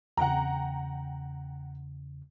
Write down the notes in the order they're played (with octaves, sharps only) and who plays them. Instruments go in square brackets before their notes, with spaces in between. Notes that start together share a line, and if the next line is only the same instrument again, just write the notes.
[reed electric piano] E2 C#3 [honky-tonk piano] F#5 G5 A#5